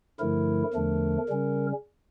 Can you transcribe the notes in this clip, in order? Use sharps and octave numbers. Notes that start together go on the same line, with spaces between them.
G2 D3 F3 A3 E4 A#4
E2 D3 F3 A3 D4
C#3 G3 C#4